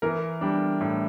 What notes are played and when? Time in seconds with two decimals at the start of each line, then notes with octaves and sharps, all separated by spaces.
0.02 E3 A#4
0.41 G3 D4
0.81 A2